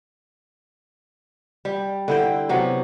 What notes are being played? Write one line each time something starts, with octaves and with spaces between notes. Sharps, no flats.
G3
D3 E4 G5
C3 F#3 B3